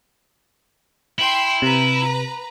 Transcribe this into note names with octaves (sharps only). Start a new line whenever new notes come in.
E4 G5 C6
C3 B4 A#5